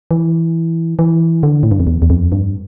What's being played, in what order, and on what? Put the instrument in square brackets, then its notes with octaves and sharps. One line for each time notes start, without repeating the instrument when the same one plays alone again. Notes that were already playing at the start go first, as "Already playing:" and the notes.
[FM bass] E3
E3
D3
A2
G2
F2
E2
E2
F2
G2